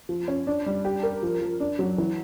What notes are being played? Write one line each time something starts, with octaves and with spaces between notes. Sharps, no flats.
F3
C#4
D4
G3
G4
A#4
F3
F3
D4
F#3
E3